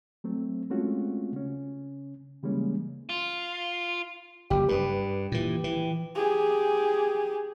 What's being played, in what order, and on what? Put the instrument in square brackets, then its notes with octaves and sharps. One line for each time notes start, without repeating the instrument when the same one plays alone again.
[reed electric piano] F#3 A3 C4
G#3 A3 C4 C#4 F4 F#4
C#3 C#4
C#3 E3 G3 G#3 A#3 C#4
[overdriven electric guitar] F4
[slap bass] F#1 [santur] G4
[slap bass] G2 [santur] B4 D#6
[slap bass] A#2 E3
E3
[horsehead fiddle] G4 G#4